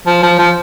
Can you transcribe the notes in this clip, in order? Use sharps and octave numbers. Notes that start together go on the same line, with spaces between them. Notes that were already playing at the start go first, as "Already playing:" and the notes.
F3
F3
F3